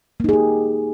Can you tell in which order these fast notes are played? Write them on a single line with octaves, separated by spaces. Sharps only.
A#3 D#4 G#4 G4